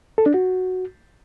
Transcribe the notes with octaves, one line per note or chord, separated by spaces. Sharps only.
A4
D4
F#4